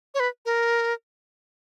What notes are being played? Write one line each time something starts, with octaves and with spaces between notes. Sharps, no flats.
C#5
B4
A#4